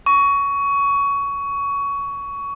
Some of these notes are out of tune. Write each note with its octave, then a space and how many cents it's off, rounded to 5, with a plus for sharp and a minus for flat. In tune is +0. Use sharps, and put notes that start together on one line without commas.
C#6 +20